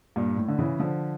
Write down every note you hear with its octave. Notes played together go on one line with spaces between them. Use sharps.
G2 A#2
A2
D3
C#3 E3
D3 F3